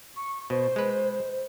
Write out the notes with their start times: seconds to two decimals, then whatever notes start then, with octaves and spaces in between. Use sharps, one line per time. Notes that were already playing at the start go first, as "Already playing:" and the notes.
0.17 C#6
0.50 B2 C5
0.76 G#3 B4